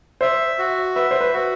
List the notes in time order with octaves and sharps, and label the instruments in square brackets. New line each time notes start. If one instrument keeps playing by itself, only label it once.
[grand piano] C5 [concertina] E5
[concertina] F#4
[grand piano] B4 [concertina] E5
[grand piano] C5
B4
[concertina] F#4